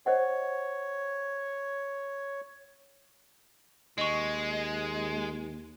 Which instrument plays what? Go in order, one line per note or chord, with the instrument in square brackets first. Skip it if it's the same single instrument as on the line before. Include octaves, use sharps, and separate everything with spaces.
[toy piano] C5 D#5 F#5 [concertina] C#5
[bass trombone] D#2 [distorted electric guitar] G#3 [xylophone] D#5 C#6